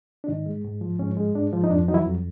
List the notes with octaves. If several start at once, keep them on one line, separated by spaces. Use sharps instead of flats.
D4
G#2 D#3 D#4
G#3
G#2
F3
G#2 C#4
G#3
G#2 D4
F3
D#4
F2 D4
F#3 D#4
E3 E4
F2